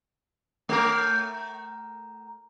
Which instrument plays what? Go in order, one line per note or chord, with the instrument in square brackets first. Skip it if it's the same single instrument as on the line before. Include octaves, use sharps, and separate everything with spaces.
[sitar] A3 A#4